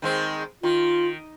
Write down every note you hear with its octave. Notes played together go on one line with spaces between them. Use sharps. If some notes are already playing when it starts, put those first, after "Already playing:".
D#3 G#3 C4
D#3 F4